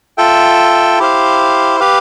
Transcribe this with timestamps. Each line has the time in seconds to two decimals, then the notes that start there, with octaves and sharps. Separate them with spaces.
0.18 F4 A4 E5 G5
0.99 E4 G4 C5 F5
1.80 G4 B4 F5